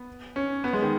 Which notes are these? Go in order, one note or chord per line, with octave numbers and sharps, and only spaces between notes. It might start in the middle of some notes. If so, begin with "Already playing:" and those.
Already playing: B3
C#4
B3
G#3
D#3